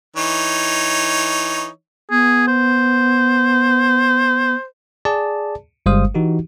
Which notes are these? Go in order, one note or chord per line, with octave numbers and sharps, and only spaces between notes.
E3 D#4 C#5
B3 G#4
C5
G#4 D5 A5
G1 G3 G#3 C5 F5 D#6
E3 D#4 F#4 G4